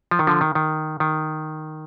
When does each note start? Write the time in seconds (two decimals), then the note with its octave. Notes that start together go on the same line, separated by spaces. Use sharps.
0.11 F3
0.19 D#3
0.27 D3 F3
0.41 D#3
0.55 D#3
1.00 D#3